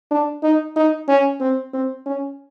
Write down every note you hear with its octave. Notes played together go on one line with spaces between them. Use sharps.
D4
D#4
D#4
C#4
C4
C4
C#4